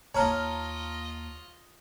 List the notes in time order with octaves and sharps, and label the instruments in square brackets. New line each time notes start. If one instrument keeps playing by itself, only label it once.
[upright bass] D#2 A#3 [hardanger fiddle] F4 D#5 [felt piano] C#5 [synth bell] A5 A#5 F6